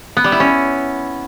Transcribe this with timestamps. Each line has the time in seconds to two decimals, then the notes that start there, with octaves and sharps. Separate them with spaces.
0.17 B3
0.24 G3
0.32 E4
0.40 C#4